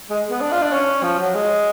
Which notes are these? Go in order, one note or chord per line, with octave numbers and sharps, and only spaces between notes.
G#3
B3
D4
F4
D4
C#4
F3
F#3
G#3